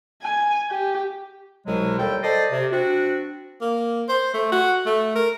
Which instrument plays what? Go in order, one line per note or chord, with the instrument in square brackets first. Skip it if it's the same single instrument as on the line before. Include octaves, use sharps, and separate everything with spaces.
[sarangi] G#5
G4
[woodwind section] C2 B2 F#3 G#3
D#2 G3 A4 G5
A4 C5 D5 D#5
C3
C4 D4 F#4
[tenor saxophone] A#3
C5
A3
F#4
A3
A#4